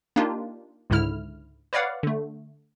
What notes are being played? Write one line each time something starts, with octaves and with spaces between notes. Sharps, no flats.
A#3 D4 D#4 F4 G4
C#2 G#2 D3 E4 F6
B4 C#5 D5 F5 F#5
D3 A3